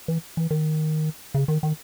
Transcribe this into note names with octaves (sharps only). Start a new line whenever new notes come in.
E3
E3
D#3
C#3
D#3
D#3